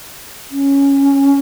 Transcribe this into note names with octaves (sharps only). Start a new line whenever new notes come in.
C#4